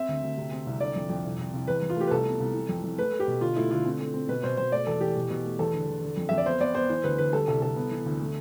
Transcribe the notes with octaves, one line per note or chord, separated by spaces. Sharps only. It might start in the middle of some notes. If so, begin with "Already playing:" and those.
Already playing: C4 E5
D2
D2
C3
C4
C2
D3 D5
F2
F2
C2
C2
C2
E2 B4
E2
F4
A3 G4
B4
C2 A4
B3
C2
E3
F2
F2
A3 B4
A3
G4
B2
D3 F4
A3 E4
D3 F4
C4
A3
C4
B2 B4
B2 C5
B2 C5
A3 D5
E2 A4
E3 G4
B2
B2
A3
E2 A4
D3
E2
D3
F2
F2 E5
D5
B3 C5
B3 D5
B3 C5
E3 C5
D2 B4
D2 B4
G3 A4
C2 A4
C2 A4
B3
E3
D2
A3